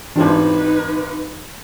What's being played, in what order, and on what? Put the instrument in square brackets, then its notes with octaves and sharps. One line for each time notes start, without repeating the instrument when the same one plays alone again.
[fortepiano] G#1 D4 [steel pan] E3 G4 C5 [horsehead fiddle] D#4 B4